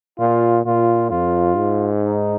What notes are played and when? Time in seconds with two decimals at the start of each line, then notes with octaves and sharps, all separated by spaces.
0.19 A#2 F4
0.65 A#2 F4
1.11 F2 F4
1.57 G#2
2.03 D#4